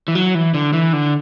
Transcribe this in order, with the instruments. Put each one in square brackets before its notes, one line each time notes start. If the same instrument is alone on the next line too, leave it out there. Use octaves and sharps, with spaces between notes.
[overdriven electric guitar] E3
F#3
E3
D3
E3
D3